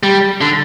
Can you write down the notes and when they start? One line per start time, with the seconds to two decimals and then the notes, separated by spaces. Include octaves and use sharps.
0.03 G3
0.41 D3